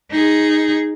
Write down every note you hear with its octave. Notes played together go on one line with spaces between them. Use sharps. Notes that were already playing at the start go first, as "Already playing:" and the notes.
D#4 G#4